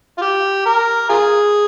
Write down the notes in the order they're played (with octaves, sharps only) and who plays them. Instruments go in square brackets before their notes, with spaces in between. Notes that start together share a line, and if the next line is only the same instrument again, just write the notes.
[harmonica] F4
G4
A#4
F4 G#4